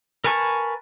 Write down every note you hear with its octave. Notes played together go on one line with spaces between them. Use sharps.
A#4 B4 G#5 A5 C#6